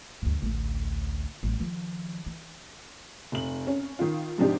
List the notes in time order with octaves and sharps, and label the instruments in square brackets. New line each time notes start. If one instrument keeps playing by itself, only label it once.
[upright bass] D2 G2
A1 D2
A1 G3
D#3 F3
E3
[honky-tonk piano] F1 F#7
C#4
D#3 F4
G#2 C3 F3 D4 D#4 G4